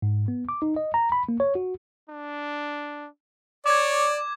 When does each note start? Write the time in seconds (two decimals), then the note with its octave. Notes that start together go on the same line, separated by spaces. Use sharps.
0.02 G#2
0.28 B3
0.49 D6
0.62 D#4
0.76 D#5
0.94 A#5
1.12 B5
1.29 A#3
1.40 C#5
1.55 F#4
2.10 D4
3.66 C#5 D5 D6 G#6